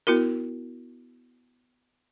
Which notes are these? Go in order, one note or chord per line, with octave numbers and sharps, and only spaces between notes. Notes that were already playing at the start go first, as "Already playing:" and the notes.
B3 E4 F#4 A#4